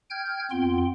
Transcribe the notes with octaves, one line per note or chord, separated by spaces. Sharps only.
G5 F6 G6 G#6
F2 B3 C4 F4 G5 C6